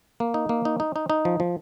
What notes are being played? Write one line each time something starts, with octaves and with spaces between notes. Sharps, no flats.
A#3
D#4
A#3
D#4
D#4
D#4
D#4
F3
F3